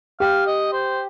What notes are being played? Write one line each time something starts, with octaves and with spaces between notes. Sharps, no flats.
G4 F5
D#5
C5